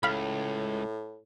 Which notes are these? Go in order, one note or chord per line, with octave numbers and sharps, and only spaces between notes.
C#2 A2 F5 B5